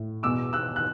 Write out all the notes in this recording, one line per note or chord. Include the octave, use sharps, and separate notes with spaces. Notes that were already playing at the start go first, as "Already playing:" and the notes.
Already playing: A2
E2 B2 D6 E6
E6 F#6
F#6